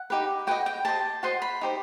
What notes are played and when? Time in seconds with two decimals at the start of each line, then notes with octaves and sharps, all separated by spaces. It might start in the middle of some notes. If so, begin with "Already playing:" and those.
Already playing: F#5
0.10 D#4 G4 B4
0.47 F#4 B4 D#5 G5
0.66 G5
0.85 G4 C5 D#5 A5
1.23 F#4 C5 D#5 C6
1.42 B5
1.61 D#4 G4 C5